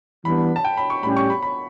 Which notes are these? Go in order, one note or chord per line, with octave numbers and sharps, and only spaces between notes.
E3 G3 B3 D4 B5
A5
G5
B5
C#6
A2 G3 C#4 G4 B5
C#6
B5
B5